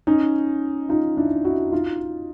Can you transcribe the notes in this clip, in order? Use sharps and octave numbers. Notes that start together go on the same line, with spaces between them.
C#4 D#4
D#4 F4
D4 E4
E4 F#4
D#4 F4